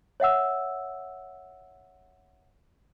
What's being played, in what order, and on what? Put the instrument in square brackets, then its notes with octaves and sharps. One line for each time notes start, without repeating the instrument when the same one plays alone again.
[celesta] C#5 E5 F#5 E6